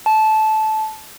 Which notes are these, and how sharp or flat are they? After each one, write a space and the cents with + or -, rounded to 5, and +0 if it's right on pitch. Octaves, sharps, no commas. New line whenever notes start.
A5 -15